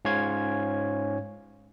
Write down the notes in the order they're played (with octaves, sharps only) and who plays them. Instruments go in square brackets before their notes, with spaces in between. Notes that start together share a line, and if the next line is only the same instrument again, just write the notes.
[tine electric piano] G#2 C#4 F4 C#5 F5 G#6